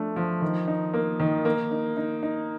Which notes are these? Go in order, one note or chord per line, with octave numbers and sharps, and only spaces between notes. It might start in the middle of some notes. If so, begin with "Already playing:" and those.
Already playing: F3 A3 D4
F3
D#3
D#4
A#3
D#3
A#3
D#4
D#4
D#4